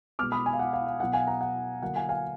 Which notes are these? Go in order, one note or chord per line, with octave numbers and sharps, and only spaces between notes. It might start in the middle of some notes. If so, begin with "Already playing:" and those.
B2 G#3 B3 D6 F6
B5 D#6
G#5 B5
F5
F#5
F5
F5
B2 F#3 B3 F#5
F5 G#5
F#5 A#5
F#5
D3 F#3 A#3 F#5
F5 G#5
F5 G#5